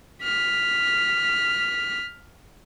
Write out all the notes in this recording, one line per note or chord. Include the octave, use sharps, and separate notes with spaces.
F6 B6